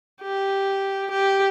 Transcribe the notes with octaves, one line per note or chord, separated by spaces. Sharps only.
G4
G4